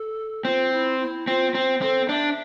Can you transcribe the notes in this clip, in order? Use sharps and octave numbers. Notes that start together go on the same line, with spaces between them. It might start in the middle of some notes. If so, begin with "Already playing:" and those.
Already playing: A4
C4 F4
E4
E4
C4 F4
C4
C4 A4
D4 E5